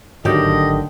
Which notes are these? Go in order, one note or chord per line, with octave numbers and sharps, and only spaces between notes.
G#1 D3 D#3 F#3 A3 G4 D#5 G5